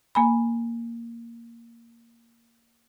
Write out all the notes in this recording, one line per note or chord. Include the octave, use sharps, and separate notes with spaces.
A#3 G#5 B5